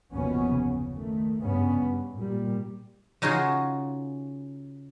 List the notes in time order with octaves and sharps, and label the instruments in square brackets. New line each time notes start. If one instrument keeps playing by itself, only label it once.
[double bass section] F#1 D#2 B2 F3 B3 C#4
C#3
D#3 A3
G2 C#3 B3 C#4
G2
A#2 G3
[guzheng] C#3 D#4 F4 F#4 G#4